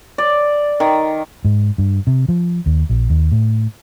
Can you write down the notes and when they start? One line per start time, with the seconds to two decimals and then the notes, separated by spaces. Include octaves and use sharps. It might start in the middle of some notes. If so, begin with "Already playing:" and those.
0.18 D5
0.80 D#3
1.45 G#2
1.78 G2
2.07 C3
2.28 F3
2.66 D#2
2.90 A#1
3.10 D#2
3.32 A2